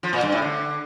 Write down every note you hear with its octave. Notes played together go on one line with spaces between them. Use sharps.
F3
A#2
G2
A2
D3